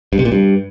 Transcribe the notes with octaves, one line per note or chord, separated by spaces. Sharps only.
G2
C3
A#2
G2